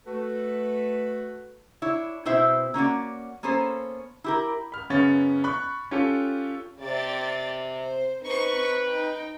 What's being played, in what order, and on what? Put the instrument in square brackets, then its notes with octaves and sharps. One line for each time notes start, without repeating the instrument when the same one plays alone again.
[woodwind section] A3 F#4 A4 B4
[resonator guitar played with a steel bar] D4 E4 C#5
B2 C4 E4 C5 E5
A#3 C#4 F#4 D5
A#3 B3 C#4 A4 C5
E4 G4 A#4
[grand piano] B5 F6
F#2 C#3 B3 C#4 A6 F7
B5 C#6 F#6
C#4 F4 G4 A4
[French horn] C3 [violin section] D5 A6
[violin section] C5
[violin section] C4 D#4 C#6 [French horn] B4
[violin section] D#4 G5